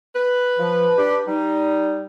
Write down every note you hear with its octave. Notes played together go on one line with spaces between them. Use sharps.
B4
F3
D4 G4
G3 D#4